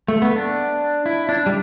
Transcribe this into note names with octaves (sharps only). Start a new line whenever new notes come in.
A3
B3
D4
E4
D4
G3